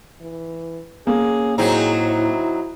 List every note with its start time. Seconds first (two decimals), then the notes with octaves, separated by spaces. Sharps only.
0.21 E3
1.07 A#3 C#4 G#4
1.58 A2 F#3 C4 D#4 G#4
2.07 E4